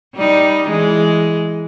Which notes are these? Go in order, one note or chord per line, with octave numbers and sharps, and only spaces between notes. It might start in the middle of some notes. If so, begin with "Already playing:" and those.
G3 D#4
E3 G#3